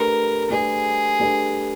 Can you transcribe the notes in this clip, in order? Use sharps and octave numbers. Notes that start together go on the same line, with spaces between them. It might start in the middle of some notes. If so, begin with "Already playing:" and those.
Already playing: A3 D4 G4 A#4 B4
A3 D4 G4 G#4 B4
A3 D4 G4 B4